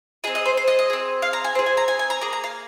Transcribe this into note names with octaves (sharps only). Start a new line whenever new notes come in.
C4 G#4 D#5
D#5
C5
C5
D#5
D#5
C4 G#4
F5
A#5
G#5
C4 G#4 C5
G#5
A#5
G#5
G#5
A#5
A#3 G#4 A#5
A#5
F5